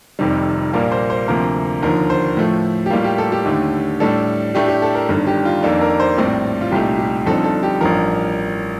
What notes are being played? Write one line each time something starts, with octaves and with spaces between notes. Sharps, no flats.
F1 F2 C3 D#3 G3
A#1 A#2 G3 A#3 A#4
C5
C5
D2 C3 F3 A#3 A#4
D#2 D3 F3 A#4
C5
A2 F3 A3
G4
A2 G3 A#3 F4
G4
A4
G4
D#2 D3 A3
A2 G3 D4 A4
A2 A3 D4 G4
G4
A4
A#4
G1 G2 D#3
G4
F4
F2 D#3 A#3 D4 A4
A#4
C5
A#1 A2 G3 C4 D5
F4
C2 A#2 A3 D#4 G4
G4
G1 G2 F3 C4 D#4 A4
A4
G4
A1 G2 F3 A#4